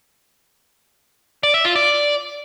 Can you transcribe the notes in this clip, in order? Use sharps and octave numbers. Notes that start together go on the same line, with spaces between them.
D5
E5
F4
D5